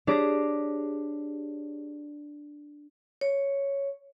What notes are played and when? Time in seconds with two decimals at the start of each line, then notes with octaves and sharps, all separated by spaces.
0.07 D4 G4 G#4 C#5 D6 A#6
3.21 C#5